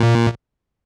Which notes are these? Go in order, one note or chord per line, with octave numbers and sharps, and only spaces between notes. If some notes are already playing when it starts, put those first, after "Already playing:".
Already playing: A#2